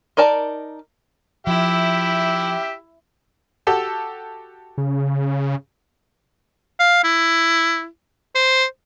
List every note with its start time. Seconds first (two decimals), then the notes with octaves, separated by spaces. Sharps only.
0.17 D#4 A#4 D5 A5
1.47 F3 E4 G4 E5
3.67 F#4 G4 A4
4.78 C#3
6.79 F5
7.04 E4
8.35 C5